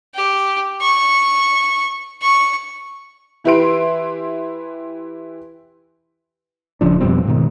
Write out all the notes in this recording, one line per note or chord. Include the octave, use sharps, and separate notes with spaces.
G4
C#6
C#6
E3 E4 G4 B4 C6 D7
D#1 C#3 F3 D4
F2 B2 G3 C4
G#2 B2 D#3